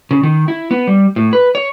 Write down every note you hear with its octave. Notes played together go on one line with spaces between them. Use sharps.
C#3
D#3
E4
B3
G3
A2
B4
C#5